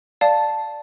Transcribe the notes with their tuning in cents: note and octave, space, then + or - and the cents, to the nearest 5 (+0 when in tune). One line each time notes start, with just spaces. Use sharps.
D5 +0 F5 +0 A5 +0